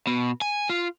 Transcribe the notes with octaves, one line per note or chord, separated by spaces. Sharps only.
B2
G#5
F4